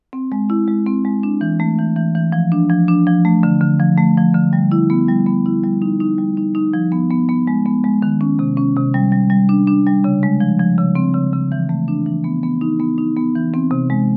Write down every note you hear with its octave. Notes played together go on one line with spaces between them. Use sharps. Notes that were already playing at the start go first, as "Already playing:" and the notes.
C4
G#3
E4
G#3
C4
G#3
D4
E3
A3
E3
E3
E3
F3
D4
F3
D4
F3
A3
D3
D3
F3
A3
F3
D3
G3
E4
B3
G3
B3
E4
G3
D#4
D#4
G3
D#4
D#4
F3
B3
B3
B3
G#3
B3
G#3
D#3
C#4
C3
C#4
C3
G3
G3
G3
D4
D4
G3
C#3
G#3
F3
F3
C#3
C4
C#3
C#3
E3
A3
D4
E3
B3
B3
D#4
B3
D#4
B3
E3
C4
C3
G#3